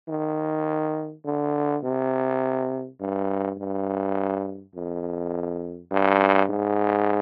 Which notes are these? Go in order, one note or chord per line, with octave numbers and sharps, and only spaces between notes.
D#3
D3
C3
G2
G2
F2
G2
G#2